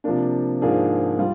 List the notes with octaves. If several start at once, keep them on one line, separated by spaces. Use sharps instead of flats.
C3 F3 A#3 D4
G#2 F3 A#3 D4 G#4
G3 F4